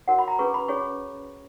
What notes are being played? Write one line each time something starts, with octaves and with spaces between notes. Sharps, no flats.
F#4 A#4 C#5 F#5
B5
A#5
C#4 G#4 B4 C#6
B5
C#4 G#4 C#5 C#6